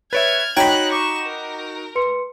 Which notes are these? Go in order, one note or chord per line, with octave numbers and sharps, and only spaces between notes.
B4 C#5 E5 F6 G#6 A6 D7
D#4 F#4 C#5 G5 A#5 B5 F#6 G#6
C#6 D6 E7
A#4
B4 C6 C#7